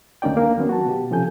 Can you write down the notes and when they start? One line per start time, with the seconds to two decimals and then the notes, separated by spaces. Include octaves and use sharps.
0.22 D2 A#3 C#4 D#4 D5 G5
0.37 A#3 D4
0.57 D#3 F#3 B3 C#4
0.69 F#4 A5
0.87 B2 G4
1.11 C3 F3 C#4 A4 G#5 G6